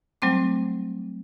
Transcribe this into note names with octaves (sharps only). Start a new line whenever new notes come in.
F#3 G3 A3 C4 C5 D6